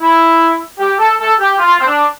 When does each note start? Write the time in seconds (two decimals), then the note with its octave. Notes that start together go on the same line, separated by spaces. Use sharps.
0.01 E4
0.80 G4
0.99 A4
1.19 A4
1.40 G4
1.59 F4
1.80 C4
1.86 D4